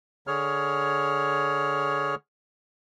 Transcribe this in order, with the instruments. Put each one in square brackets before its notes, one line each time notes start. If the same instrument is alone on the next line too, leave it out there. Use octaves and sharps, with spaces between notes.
[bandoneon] D3 G#4 C#5 F6